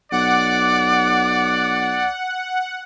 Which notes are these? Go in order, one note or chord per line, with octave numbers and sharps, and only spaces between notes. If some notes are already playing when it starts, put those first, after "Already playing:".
B1 D5 F#5 D6